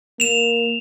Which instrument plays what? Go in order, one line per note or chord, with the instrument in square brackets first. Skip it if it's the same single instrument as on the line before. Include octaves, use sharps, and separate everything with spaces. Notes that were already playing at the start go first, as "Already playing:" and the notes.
[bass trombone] A#3 [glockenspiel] E7 F7